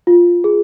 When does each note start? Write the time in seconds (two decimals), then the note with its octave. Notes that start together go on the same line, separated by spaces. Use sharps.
0.07 F4
0.44 G#4